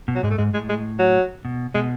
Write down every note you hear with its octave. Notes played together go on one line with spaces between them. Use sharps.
B2
F#3
G#2 G#3
A3
G#2 G#3
A2 G#3
G#3
F#3
B2
B2 G#3